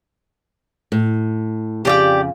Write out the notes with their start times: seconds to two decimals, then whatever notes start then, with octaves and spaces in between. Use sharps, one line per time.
0.92 A2
1.85 F2 C#3 G4 D5 G5